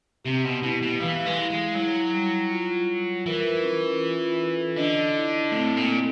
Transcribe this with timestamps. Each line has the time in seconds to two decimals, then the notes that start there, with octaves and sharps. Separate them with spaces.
0.25 C3 G4
0.44 B2
0.63 B2 E4
0.82 B2
1.00 E3 F5
1.26 G#3
1.38 E4
1.50 G#3
1.75 F#3 E4
2.13 G3
2.51 F4
2.89 F4
3.26 E3 A#4
3.64 C#4
4.02 F4
4.40 A4
4.77 D3 D#5
5.15 E4
5.52 A2 C4
5.77 A#2
5.90 A4